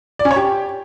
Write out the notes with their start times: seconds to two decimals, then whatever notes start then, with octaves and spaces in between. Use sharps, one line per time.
0.19 D5
0.25 C#4
0.31 C#5
0.36 G4